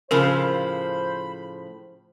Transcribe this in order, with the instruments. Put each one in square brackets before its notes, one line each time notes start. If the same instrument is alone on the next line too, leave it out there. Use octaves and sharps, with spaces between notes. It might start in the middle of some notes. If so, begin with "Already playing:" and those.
[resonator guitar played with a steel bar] A2 C#3 F3 [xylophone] A#4 [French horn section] C5 [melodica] B5